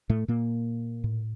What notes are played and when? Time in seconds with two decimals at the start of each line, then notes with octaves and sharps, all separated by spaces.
0.10 A2 A3
0.28 A#2 A#3
1.04 A2